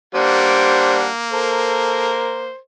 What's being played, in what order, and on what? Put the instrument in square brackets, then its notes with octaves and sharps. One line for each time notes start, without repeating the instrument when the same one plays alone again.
[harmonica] G3 D4 F#5 [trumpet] A#3 [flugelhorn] C5
[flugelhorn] A4 [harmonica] A#4 C5